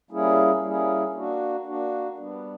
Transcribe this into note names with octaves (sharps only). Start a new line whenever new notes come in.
G3 A#3 C#4 E4 G#4
G3 A#3 C#4 E4 G#4
A#3 D4 F#4
A#3 D4 F#4
G3 B3 D4